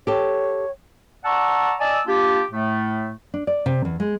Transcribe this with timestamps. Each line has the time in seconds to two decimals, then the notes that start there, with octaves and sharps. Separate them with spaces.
0.07 G4 A4 C#5
1.25 D5 F#5 A5 A#5 C#6 E6
1.80 D5 D#5 G#5 A5 E6
2.07 A#3 D4 F4 G4
2.52 A2 A3
3.34 D4
3.47 D5
3.66 C3
3.85 E2
4.00 G#3